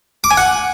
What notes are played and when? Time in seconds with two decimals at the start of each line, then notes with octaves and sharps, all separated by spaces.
0.24 D6
0.31 G#5
0.37 F#5